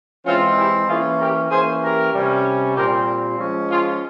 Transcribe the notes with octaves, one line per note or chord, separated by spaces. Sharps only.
E3 G#3 C4 C#4 F4
E4 G4
E3 A#3 C#4 F4 G#4
G4 A#4
E3 A#3 C#4 G#4 C5
G4 A#4
C3 G3 C#4
A#2 G3 C4 G4 A#4
F3 G#3 C#4
F4 G#4